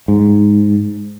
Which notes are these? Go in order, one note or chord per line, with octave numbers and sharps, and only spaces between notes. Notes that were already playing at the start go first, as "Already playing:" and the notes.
G#2